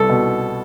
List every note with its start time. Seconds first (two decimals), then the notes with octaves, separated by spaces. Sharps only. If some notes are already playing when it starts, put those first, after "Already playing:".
Already playing: C2 B3 A4
0.09 B2